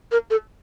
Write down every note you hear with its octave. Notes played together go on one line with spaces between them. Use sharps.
A#4
A4